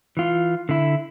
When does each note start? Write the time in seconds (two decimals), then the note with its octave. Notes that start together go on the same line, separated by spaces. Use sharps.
0.17 E3 F4
0.69 D3 E4